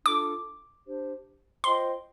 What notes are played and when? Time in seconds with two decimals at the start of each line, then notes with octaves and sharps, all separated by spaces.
0.05 D4 F4 A4 D6
0.86 D4 G4 C5
1.64 F4 C5 D#5 G5 C6